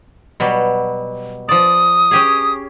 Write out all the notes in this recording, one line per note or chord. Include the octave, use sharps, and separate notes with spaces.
B2 F#3 G3
F3 D5 D#6
C#4 G4 G#4